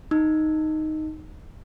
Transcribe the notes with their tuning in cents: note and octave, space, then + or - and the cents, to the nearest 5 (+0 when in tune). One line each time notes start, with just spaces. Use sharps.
D#4 +0 E6 -5